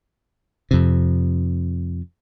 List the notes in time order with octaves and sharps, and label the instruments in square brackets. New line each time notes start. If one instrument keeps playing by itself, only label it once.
[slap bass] F2 C3